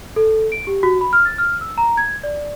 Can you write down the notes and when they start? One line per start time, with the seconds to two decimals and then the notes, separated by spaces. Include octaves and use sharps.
0.16 A4
0.52 D7
0.67 G4
0.83 F#4
1.01 B5
1.13 F6
1.25 A6
1.38 F6
1.61 E6
1.78 A#5
1.97 G#6
2.24 D5